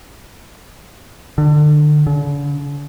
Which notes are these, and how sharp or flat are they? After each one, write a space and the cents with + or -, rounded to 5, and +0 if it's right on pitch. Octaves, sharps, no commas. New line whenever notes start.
D3 +30
D3 -45